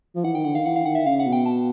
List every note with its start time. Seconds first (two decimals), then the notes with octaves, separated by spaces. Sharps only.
0.15 F3
0.24 E3 F#5
0.34 D#3 G5
0.45 D3 F#5
0.55 D#3 F5
0.65 E3 F#5
0.76 F5
0.85 D#3 F#5
0.95 E5
1.06 C#3 F5
1.20 F#5
1.26 B2
1.32 G5
1.46 A5